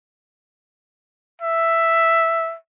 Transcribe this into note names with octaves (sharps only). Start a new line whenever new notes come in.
E5